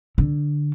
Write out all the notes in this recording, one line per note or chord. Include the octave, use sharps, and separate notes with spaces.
D3